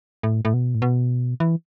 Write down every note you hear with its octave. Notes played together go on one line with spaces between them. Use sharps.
A2
A2
B2
A2
B2
E3